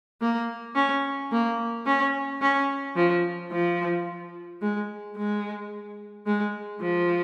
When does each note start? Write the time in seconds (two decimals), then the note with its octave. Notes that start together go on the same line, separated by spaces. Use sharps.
0.21 A#3
0.76 C#4
1.32 A#3
1.86 C#4
2.42 C#4
2.96 F3
3.52 F3
4.62 G#3
5.17 G#3
6.26 G#3
6.81 F3